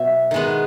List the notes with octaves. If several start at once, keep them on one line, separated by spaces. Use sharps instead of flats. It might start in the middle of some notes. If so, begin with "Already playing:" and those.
Already playing: B2 F#3 E5
D#3 G#3 B3